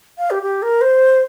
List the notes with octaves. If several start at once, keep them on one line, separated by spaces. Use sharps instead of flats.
F5
G4
G4
A#4
C5